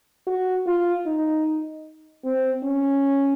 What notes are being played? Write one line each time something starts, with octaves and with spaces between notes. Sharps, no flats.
F#4
F4
D#4
C4
C#4